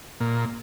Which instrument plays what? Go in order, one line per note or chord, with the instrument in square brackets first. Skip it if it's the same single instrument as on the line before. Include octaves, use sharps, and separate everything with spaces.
[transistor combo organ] A#2